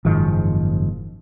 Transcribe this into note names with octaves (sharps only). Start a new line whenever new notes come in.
F#1 G#2 D#3 F3